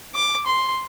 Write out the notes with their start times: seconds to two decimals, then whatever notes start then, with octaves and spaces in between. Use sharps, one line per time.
0.15 D6
0.46 C6